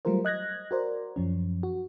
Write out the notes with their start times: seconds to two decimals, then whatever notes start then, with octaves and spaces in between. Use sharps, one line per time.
0.05 F#3 G3 A3 F4 A#4 C5
0.25 D#5 F#6 G#6 A#6
0.71 F#4 A#4 C5 D5
1.16 F#2 F3 C#4
1.63 F#4